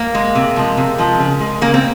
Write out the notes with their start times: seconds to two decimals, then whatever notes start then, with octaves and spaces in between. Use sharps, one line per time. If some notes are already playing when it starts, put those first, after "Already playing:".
Already playing: A#3
0.15 G#3
0.35 C3
0.56 F3 G#3
0.77 C3
0.98 F3 G#3
1.20 C#3
1.40 G#3
1.61 C#3 A#3
1.74 C4